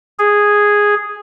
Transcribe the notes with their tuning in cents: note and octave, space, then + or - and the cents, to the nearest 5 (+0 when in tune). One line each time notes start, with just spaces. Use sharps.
G#4 -5